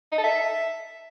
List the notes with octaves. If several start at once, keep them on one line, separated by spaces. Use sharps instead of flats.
D#4
A4
E5